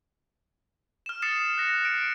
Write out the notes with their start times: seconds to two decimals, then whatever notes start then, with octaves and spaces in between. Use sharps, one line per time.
1.06 F6 E7
1.22 D#6 A6 C7 C#7 E7
1.58 F#6 A#6 C#7
1.85 D7